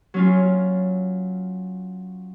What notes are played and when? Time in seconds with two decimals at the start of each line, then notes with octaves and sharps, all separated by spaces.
0.14 F#3 C#4 F4